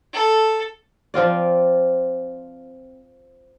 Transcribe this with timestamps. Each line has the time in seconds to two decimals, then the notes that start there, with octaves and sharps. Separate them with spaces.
0.13 A4
1.14 F3 C4 F4 D5